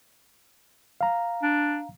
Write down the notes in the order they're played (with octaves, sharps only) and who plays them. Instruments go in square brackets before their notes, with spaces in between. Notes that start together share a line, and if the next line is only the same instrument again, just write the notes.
[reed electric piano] F5 A#5
[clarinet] D4